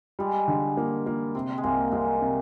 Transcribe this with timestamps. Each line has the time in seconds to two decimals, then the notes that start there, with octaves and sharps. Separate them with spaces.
0.19 G3 G#3
0.48 D3 G#3
0.77 A#3
1.06 A#3
1.35 C3 C4
1.58 G#3
1.64 C2 A#3
1.92 C2 G#3
2.22 C3